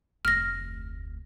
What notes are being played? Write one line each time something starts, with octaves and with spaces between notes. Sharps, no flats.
F1 D2 F6 A#6